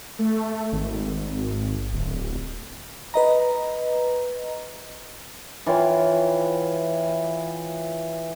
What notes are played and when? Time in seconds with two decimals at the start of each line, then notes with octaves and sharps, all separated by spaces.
0.19 A3
0.72 G#1
1.93 D1
3.14 B4 D#5 A#5
5.66 E3 F4 C#5 G5